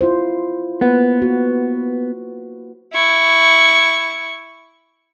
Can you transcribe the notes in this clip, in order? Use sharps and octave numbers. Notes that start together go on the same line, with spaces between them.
E4 F4 C5
A#3 B3 B4 F#5
F#4
E4 C#6